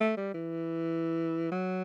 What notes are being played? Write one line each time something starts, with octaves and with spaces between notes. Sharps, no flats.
A3
G3
E3
F#3